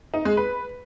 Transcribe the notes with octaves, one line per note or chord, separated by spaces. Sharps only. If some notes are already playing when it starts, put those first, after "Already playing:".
D#4
G#3
B4